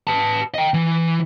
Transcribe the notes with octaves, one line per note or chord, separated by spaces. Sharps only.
B4 A5
D#5 G5
E3